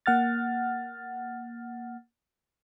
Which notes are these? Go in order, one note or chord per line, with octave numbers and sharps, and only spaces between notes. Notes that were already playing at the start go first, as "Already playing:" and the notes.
A#3 F#5 F6 A6